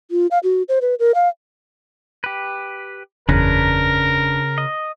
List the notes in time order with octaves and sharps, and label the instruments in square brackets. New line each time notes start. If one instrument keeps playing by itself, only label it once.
[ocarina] F4
F5
F#4
C5
B4
A#4
F5
[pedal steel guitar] G4 B4
[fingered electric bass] F#1 E2 [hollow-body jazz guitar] C#3 [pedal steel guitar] D4 B4 A#5 [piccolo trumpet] A#4
[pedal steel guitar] D#5